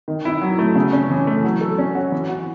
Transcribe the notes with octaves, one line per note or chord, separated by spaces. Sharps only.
D#3
E4
F#3
A3
C#3
C#4
E3
A3
F#3
A4
C#4
F#4
E3
F#4